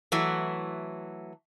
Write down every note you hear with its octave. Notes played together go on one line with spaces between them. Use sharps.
E3 F#3 A3